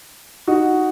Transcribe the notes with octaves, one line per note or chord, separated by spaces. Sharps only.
D#4 F#4